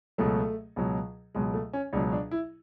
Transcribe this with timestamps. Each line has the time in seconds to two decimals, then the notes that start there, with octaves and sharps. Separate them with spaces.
0.18 C#2 B2 F#3 A3
0.76 C#2 B2 F#3
1.35 C#2 B2 F#3 G#3
1.54 A3
1.73 C#4
1.93 C#2 B2 F#3 D4
2.12 D4
2.31 E4